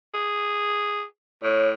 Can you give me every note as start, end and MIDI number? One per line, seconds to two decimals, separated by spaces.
0.14 1.04 68
1.43 1.74 45
1.43 1.69 73